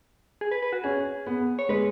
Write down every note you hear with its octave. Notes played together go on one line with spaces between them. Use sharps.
G#4
B4
B4
F#4
C#4 G#4
B3
C#5
G#3 B4